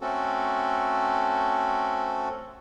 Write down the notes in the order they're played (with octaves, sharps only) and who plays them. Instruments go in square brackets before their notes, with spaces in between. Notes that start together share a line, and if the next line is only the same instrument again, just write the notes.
[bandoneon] A3 C4 C#4 F#4 A4